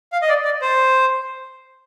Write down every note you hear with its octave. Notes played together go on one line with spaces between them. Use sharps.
F5
D#5
D5
D5
C5